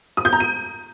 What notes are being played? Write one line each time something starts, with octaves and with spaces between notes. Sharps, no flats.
D#6
G6
A#5
D#7